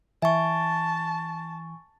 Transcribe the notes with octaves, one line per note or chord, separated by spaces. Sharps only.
E3 E5 G#5 A5 C#6